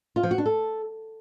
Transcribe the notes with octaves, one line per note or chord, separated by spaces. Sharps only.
F4
F3
F#4
D4
A4